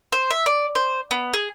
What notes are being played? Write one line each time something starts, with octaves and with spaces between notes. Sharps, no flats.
C5
E5
D5
C5
B3
G#4